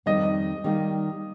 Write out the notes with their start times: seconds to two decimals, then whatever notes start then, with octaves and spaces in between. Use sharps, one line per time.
0.06 F2 D#3 G3 A#3 D#4 D#5
0.64 D#3 G3 A#3 D#4